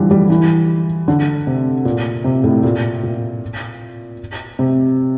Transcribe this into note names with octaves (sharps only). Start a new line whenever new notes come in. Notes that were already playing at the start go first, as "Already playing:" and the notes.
Already playing: D3 E3 F3 G3
G3
E3
D3
C3
A#2
C3
A2
A#2
A#2
C3